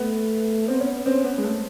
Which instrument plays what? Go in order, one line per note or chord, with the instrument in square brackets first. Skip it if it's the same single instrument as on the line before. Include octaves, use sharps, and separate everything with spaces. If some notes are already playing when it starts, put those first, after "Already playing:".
Already playing: [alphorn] A3 [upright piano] B3
[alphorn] B3 [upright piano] C4
[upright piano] C#4
[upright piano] C4 [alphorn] C#4
[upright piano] B3
G#3
A3